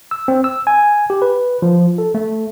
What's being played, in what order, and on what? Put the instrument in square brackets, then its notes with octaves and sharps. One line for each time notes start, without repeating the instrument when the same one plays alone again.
[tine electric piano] E6
C4
E6
G#5
G4
B4
F3
A4
A3